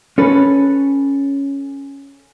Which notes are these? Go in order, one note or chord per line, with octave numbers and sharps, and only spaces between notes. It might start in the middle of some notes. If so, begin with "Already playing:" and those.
C#4 A4 B4